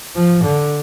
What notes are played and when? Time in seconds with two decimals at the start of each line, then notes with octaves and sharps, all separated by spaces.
0.16 F3
0.45 D3